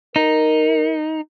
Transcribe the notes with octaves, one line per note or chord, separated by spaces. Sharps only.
D#4 A#4